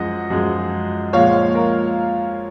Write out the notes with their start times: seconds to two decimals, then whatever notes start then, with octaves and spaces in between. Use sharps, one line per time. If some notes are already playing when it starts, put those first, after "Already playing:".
Already playing: F#2 F3 G#3 D#5 F#5
0.30 F#2 F3 G#3
1.13 A#2 F3 G#3 C#5 F5
1.55 A#4